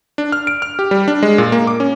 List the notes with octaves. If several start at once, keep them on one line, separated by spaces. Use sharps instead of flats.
D4
F6
D7
F6
G4
G3
D4
G#3
A#2
A#3
D6
C#4